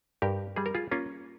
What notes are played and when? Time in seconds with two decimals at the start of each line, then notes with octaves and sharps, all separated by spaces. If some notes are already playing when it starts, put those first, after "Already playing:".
0.22 G2 G4 A#4
0.56 G3 G#4
0.66 A#4
0.75 F4 G#4
0.91 A#3 C#4 F4